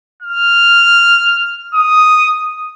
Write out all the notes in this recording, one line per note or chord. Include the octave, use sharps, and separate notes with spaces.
F6
D#6